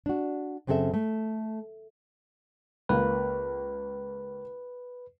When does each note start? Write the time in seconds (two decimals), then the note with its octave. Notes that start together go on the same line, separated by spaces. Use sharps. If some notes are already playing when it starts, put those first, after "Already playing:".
0.06 D4 F#4
0.67 F#2 C#3 B3 C4 A4 E5
0.94 A3
2.89 C#2 A#3 B4